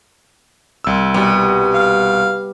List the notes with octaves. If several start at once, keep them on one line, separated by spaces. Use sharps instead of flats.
C2 E6
B2 G3
F5